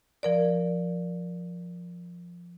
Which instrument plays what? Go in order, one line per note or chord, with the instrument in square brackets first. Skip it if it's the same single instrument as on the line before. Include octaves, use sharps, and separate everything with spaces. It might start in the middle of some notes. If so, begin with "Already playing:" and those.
[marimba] F3 A#4 D5